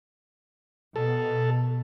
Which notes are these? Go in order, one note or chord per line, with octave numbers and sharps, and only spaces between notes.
B2 A4